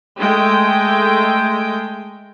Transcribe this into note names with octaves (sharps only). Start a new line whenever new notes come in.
G#3 A3 G5